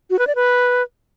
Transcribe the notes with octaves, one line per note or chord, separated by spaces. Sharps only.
F#4
B4
D5
B4